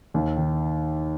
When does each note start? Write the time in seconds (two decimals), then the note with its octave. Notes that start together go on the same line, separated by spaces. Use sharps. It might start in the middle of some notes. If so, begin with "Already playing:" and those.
0.14 D#2
0.37 D#3